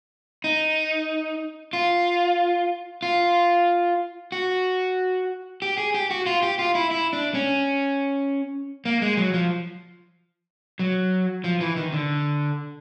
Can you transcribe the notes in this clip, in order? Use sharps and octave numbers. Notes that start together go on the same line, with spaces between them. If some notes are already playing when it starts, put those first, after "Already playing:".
D#4
F4
F4
F#4
G4
G#4
G4
F#4
F4
G4
F4
E4
E4
D4
C#4
A#3
G#3
F#3
F3
F#3
F3
E3
D#3
D3